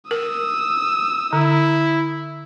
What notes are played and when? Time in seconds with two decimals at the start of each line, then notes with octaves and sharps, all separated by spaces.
0.11 A#4 D#6 E6
1.33 D3 E4